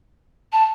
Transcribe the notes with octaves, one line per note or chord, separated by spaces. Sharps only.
A5